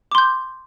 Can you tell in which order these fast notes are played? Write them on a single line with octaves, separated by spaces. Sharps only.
D6 C6 G6